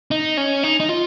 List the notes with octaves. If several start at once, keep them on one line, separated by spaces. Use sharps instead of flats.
D#4
C#4
D#4
D#4
F4